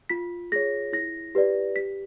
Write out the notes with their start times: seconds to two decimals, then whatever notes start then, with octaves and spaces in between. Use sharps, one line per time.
0.09 F4 B6
0.52 G#4 C#5 A#6
0.93 E4 A#6
1.35 G4 B4 D5
1.76 G4 B6